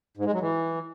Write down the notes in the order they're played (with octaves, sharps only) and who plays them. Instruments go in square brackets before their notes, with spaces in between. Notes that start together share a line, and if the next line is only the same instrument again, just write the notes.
[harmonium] G#2
G#3
F#3
E3